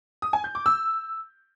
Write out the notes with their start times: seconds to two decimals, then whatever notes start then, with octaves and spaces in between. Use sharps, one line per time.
0.22 D#6
0.33 G#5
0.44 G6
0.55 D6
0.66 E6